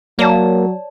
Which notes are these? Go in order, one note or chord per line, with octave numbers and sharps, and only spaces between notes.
F#3 A#3 C#5 D5 A5